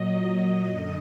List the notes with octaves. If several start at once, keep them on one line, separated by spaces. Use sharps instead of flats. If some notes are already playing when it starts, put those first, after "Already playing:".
Already playing: A#2 F#3 D#5
D#5
F#2 D3 D#5